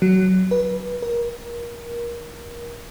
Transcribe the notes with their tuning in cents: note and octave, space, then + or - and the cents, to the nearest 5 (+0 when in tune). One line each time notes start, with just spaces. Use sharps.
F#3 +15
B4 -25
A#4 +25